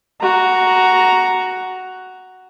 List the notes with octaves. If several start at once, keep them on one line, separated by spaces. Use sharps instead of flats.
F#4 A#5